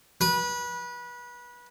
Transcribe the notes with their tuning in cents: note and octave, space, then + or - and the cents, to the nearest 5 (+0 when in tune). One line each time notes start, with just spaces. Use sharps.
B4 -25